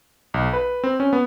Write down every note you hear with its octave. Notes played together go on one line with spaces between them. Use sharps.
B1
B4
C4
C#4
B3